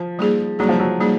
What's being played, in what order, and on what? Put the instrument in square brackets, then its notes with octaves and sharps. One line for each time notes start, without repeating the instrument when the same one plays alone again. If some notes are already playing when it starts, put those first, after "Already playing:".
Already playing: [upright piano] F3
[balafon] G3 A#3 D#4 G#4
[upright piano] F#3 [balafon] G3 A#3 D#4 G#4
[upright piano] F3
F#3
[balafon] G3 A#3 D#4 G#4